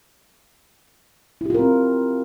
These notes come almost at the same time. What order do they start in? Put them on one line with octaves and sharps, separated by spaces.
E4 G4 F4 A#4 C4